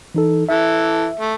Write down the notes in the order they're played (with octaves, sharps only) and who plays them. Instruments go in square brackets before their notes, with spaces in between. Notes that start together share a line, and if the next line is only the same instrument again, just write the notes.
[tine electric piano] E3 D#4 A4
[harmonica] E3 A4 [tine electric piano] E5
[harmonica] A3